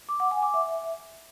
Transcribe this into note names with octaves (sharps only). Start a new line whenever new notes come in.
D6
F#5
G#5
D6
E5